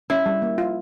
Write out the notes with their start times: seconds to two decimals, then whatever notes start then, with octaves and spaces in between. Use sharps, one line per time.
0.10 C#4 E4
0.26 G3
0.42 A#3
0.58 F4